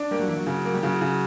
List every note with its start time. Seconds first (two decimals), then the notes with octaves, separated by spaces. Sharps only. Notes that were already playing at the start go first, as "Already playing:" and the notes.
Already playing: D4
0.11 G3 A#3
0.19 F#3
0.28 E3 A#3
0.37 F#3
0.46 C#3
0.65 A#3
0.74 G3
0.83 C#3 F#3
1.01 C#3